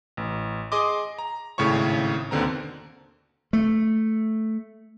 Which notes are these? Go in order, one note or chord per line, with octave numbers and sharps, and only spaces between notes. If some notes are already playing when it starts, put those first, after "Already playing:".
A1
G#4 D#5 C6 D6
A#5
G#1 A2 C#3 C#5 C#6
D#2 B2 D3 C4 A#5
A3